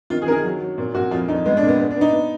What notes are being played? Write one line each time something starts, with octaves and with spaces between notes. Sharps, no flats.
D#3 F4
G#4
D#3 A#4
G#4
F#3
F#3
A#2
A#2 F#4
F2 F4
F2 D#4
G#3 B3
D4
A#2
B3
B3
D4
B3 D#4
B3